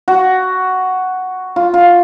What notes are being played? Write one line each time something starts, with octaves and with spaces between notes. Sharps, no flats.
F#4
F4
F4